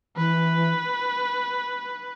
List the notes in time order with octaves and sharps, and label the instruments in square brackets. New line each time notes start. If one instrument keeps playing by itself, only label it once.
[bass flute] E3 [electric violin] B4